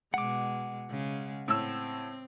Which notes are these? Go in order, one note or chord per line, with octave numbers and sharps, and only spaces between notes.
B2 G#3 F#5 D6
C#3 G#3
A2 C4 E6